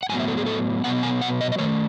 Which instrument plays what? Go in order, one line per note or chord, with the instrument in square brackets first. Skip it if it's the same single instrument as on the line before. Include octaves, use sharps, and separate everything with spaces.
[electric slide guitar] F#5
A2 F#3 B3 G#5
E5
A4
G#4
A4
B2 F#3 B3 F#5
G#5
F#5
D#5
D#5
D#3 A3 C#5